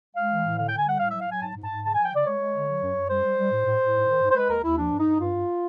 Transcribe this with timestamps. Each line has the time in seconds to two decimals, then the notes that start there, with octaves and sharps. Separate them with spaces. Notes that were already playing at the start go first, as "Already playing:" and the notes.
0.15 G#3 F5
0.30 E3
0.44 A2
0.58 D3 F5
0.69 D3 G5
0.79 G#5
0.86 G3 F#5
0.99 A2 F5
1.11 F#3 E5
1.21 F5
1.27 F#3 G#5
1.42 G#2 A5
1.56 G#2
1.63 A5
1.70 G#2
1.83 C#3 A5
1.95 F3 G#5
2.05 G5
2.12 C#3 D5
2.25 G#3 C#5
2.40 G#3
2.53 D3
2.68 F#3
2.82 F#2
2.96 F#2
3.10 G3 C5
3.24 G3
3.38 G3
3.52 A2
3.66 A2
3.80 A2
3.94 G#2
4.08 D#3
4.21 G#2
4.31 C5
4.36 G#3 B4
4.50 D#2 A#4
4.64 D#2 E4
4.78 F3 D4
4.92 G2
5.00 D#4
5.06 G2
5.20 G2 F4
5.34 G2